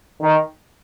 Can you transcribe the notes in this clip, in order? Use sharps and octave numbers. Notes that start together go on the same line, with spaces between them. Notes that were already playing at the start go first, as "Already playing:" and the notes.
D#3